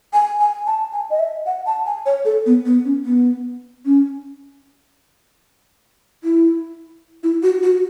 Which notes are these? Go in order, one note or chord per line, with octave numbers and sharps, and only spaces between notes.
G#5
G#5
A5
G#5
D#5
E5
F#5
A5
G#5
C#5
A4
B3
B3
C#4
B3
C#4
E4
E4
F#4
F#4